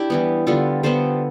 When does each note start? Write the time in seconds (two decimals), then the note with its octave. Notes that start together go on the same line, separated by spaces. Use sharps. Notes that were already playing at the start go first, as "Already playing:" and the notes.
Already playing: D4 E4 G4
0.10 E3 G3 B3
0.47 D3 G3 B3 F4 A4
0.83 D3 G3 B3 A4 C5